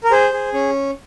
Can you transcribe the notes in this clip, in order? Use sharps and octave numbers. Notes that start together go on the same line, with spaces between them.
A#4
G#4 C5
G#4
C#4